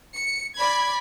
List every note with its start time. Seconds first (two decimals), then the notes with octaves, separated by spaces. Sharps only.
0.15 C#7
0.55 D5 B5 G#6